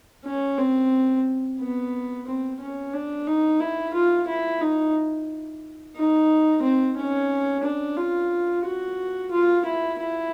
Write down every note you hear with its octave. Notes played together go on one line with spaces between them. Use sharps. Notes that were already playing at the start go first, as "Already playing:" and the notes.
C#4
C4
B3
C4
C#4
D4
D#4
E4
F4
E4
D#4
D#4
C4
C#4
D4
F4
F#4
F4
E4
E4